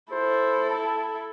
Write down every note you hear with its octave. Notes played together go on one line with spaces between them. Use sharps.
E4 A4 C5
A5